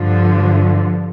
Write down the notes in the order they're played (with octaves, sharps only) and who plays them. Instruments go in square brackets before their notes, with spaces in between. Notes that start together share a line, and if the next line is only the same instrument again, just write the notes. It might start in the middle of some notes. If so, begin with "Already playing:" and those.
Already playing: [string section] G2 D3 F3